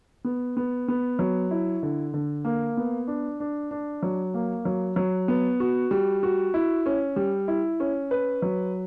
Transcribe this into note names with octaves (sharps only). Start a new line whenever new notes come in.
B3
B3
B3
F#3
E4
D3
D3
A#3
B3
D4
D4
D4
F#3
A#3
F#3
F#3
B3
F#4
G3
F#4
E4
C#4
G3
E4
C#4
B4
F#3